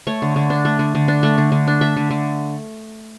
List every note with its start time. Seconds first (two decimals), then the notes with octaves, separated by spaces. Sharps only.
0.07 A3 C#5
0.22 D3
0.36 D3
0.50 D4
0.65 A3
0.79 D3
0.95 D3
1.08 D4
1.23 A3
1.38 D3
1.52 D3
1.67 D4
1.81 A3 E5
1.97 D3
2.11 D3